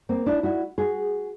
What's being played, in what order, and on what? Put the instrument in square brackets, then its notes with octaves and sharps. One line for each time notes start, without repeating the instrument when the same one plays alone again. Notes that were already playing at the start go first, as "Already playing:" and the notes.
[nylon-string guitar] A#3 C4
D4 E4
E4 F#4
F#4 G#4